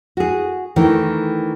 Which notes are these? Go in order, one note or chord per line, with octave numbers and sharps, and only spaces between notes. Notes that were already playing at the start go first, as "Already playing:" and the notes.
F#4 G#4
D#3 E3 A3 A#4